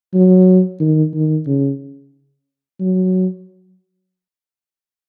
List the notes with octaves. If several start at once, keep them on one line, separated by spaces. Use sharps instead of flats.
F#3
D#3
D#3
C#3
F#3